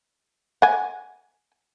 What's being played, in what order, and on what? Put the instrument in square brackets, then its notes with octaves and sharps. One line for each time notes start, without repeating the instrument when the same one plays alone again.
[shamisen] F#5 G#5